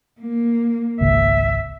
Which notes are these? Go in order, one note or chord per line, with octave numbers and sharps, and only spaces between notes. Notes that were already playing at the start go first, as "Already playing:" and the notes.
A#3
G#1 C#2 E5